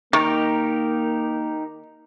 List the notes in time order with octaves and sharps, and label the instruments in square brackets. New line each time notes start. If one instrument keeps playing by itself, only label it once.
[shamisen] D#3 [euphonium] A#3 [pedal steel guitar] D#4 G4 A#4